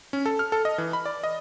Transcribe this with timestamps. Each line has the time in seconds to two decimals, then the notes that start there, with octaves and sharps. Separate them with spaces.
0.13 C#4
0.26 A4
0.39 F6
0.52 A4
0.65 D#5
0.78 E3
0.93 B5
1.06 D5
1.24 D#5